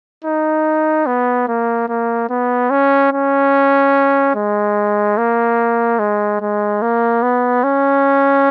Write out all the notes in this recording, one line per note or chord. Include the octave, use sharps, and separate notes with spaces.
D#4
B3
A#3
A#3
B3
C#4
C#4
G#3
A#3
G#3
G#3
A#3
B3
C#4